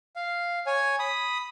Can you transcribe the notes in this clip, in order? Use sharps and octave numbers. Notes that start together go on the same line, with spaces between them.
F5
C#5 G#5
B5 D#6